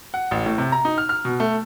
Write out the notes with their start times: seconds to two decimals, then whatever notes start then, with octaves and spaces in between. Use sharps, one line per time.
0.14 F#5
0.31 A1
0.46 A2
0.58 C3
0.72 A#5
0.85 D#4
0.98 F6
1.09 F6
1.25 B2
1.40 A3